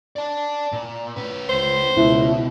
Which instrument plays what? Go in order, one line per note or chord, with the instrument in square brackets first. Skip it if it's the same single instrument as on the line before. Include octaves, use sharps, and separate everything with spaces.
[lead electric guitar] D5 A5
A#2
C#4 B4
[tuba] C#2 [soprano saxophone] C5
[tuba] C#2 [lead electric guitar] B2 [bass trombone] E4